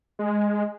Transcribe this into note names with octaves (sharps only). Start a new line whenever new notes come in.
G#3